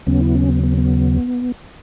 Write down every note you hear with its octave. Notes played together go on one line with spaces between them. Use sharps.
D#2 C#3 F#3 B3 C#4
E4
C#4
B3
B3
B3